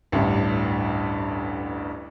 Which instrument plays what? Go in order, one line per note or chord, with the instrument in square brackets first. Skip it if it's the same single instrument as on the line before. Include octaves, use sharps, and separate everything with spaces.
[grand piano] A1 D2 G2